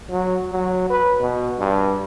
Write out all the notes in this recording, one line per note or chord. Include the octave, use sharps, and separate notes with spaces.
F#3
F#3
B4
B2
G2